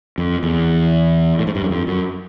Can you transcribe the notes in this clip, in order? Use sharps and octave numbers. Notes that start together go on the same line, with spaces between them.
F2
E2
A2
G#2
G2
F#2
F2
F#2